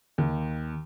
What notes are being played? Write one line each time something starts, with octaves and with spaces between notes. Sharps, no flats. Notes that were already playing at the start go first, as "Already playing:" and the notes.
D#2